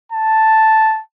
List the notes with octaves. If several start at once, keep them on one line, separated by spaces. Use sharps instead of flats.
A5